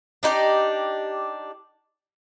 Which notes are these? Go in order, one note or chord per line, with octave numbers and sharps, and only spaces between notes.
D4 D#4 F#4 G4